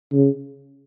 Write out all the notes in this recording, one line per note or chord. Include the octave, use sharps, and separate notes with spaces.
C#3